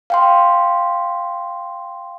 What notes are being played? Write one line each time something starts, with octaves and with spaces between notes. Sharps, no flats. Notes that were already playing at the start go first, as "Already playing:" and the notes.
F5 G5 C6